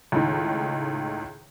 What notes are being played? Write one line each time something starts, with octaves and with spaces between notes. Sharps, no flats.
C#2 A2 D#3